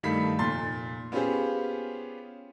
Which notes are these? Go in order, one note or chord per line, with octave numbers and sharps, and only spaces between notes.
G2 D#3 A3 F5 B5 B6
F1 A#2 C6 A6
B3 C#4 F4 G4 G#4 C5